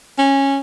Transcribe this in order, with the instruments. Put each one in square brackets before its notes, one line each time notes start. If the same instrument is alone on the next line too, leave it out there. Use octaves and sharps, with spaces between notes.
[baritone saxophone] C#4